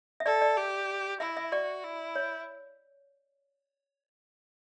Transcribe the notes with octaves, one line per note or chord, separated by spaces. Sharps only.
E5
A4 D5
D5
G4
E4 E5
E5
F#4 D5
E4
C#5